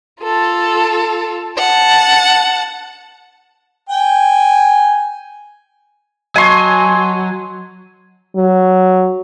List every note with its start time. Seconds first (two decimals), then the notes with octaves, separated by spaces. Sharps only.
0.22 F4 A4
1.58 F#5 A5
3.89 G5 G#5
6.36 F#3 D#5 G#5 A5 C6 C#6
8.36 F#3